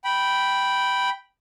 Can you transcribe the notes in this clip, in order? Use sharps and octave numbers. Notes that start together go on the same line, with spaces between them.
G5 B5